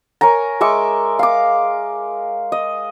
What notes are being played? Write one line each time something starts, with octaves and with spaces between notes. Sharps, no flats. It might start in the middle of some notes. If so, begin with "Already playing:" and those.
A#4 C#5 G#5 A#5
G#3 E5 C#6 D6
F5 D6
D#5